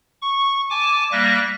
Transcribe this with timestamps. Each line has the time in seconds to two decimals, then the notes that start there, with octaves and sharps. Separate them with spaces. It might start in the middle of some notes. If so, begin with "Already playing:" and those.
0.21 C#6
0.70 G#5 A5 D6
1.12 G3 A#3 E5 F#6 A#6